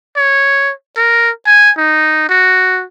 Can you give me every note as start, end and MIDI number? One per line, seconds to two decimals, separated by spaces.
0.17 0.72 73
0.97 1.30 70
1.46 1.70 80
1.77 2.27 63
2.29 2.84 66